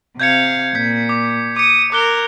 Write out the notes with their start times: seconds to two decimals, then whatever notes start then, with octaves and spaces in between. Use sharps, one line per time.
0.20 C3 F5 G6 G#6 C#7
0.75 A#2 G6 B6
1.09 D6
1.56 D6 D#6 C#7
1.92 A#4 D6 F#6 G7